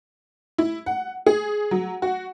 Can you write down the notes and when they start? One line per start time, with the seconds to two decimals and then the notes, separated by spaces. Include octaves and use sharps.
0.58 E4
0.86 F#5
1.26 G#4
1.71 F#3
2.02 F#4